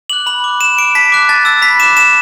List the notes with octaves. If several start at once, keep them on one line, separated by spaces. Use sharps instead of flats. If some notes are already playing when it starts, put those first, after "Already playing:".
D6 F#6 F#7
B5 F#7
D6 F#6
B5 E7
D6 F#6 D7
A5 B6
D6 F#6
A5 A6
E6 A6
B5 B6
D6 F#6 E7
A5 E7